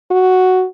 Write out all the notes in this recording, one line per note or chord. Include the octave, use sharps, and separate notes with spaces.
F#4